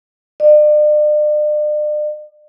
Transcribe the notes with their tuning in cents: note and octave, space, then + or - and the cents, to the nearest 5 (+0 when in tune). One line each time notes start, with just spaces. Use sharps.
D5 +40